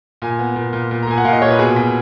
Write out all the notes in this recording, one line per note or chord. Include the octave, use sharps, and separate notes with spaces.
A#2 G#5
B3
A#2
A#2
A#2
A#5
A#2 G#5
F#5
A#2 F5
D#5
A#2 C#5
B4
B2 G#4
B2